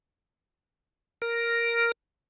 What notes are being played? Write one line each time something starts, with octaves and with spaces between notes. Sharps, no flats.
A#4